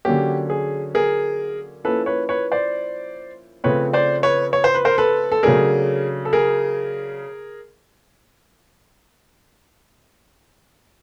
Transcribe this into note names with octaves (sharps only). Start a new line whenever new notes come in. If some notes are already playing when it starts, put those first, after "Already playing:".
D3 F#3 A#3 C#4 G4
G#4
G#4 A#4
F3 A#3 C#4 E4 A4 B4
B4 C#5
B4 C#5
C5 D5
C#3 F3 A3 C4 B4 C#5
C5 D5
B4 C#5
C#5
C5
B4
A#4 C5
A4 B4
A4
C#3 F#3 A3 D4 G#4 A#4
A4
G#4 A#4